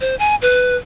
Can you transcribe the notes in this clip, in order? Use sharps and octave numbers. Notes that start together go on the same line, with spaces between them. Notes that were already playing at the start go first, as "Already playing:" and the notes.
C5
G#5
B4